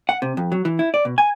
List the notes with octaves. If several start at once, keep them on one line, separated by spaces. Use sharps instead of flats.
F#5
C3
F2
F#3
E3
E4
D5
B2
G#5